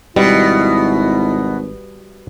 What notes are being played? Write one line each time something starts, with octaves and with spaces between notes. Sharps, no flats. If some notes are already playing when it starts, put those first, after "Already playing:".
G#1 B2 G3 E4